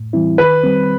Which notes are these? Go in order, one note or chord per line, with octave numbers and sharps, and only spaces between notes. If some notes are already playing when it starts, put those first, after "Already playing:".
Already playing: A2
E3 G3 C4 E4
D#3 B4
G3 C4